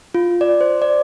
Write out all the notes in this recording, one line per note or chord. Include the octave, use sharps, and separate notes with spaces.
F4
D5
C5
D5